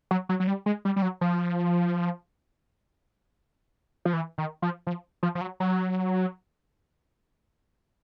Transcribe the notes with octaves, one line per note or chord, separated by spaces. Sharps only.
F#3
F#3
F#3
G3
G#3
G3
G3
F#3
F3
F3
E3
D#3
F3
F3
F3
F3
F#3
F#3